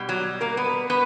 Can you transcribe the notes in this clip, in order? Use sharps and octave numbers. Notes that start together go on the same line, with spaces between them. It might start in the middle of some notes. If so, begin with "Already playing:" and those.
Already playing: B2 G3
F#3 F#4
A#3 A#4
B3 B4
B3 B4